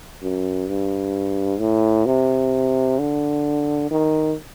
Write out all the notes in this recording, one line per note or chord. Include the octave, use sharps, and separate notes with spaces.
F#2
G2
A2
C3
D3
D#3